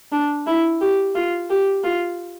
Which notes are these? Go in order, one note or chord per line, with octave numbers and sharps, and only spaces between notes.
D4
E4
G4
F4
G4
F4